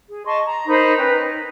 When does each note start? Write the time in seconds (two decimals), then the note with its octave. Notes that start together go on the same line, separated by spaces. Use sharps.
0.09 G#4
0.26 D#5 A5 C6 C#6
0.45 A#5
0.67 D#4 A#4 C5 B5
0.98 C#4 B4 G5
1.13 D#4